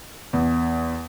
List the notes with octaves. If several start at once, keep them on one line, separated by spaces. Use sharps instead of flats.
E2